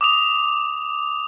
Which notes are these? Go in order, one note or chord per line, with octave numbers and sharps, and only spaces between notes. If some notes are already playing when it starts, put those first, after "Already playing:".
D6 D#6 F7